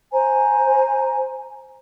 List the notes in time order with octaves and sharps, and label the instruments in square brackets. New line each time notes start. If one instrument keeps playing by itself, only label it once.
[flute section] C5 G#5 A#5